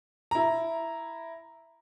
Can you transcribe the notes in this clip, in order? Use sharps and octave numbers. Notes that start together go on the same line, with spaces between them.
E4 A#5